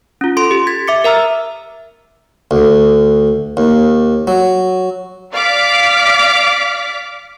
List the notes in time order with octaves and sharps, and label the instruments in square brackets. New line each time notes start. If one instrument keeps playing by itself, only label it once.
[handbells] C#4 F4
A4 C6 D7
G4
G#6 A6 B6
E5 D6 C#7
A#4 E5 A#5 E6 F6
[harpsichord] D2
D#2
F#3
[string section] D5 F5 D6 F6 B6